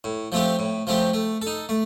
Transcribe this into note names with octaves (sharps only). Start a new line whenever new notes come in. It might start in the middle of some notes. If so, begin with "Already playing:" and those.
A2
F3 A3 C4 G4
A2
F3 A3 C4 G4
A3
A4
D#4
A3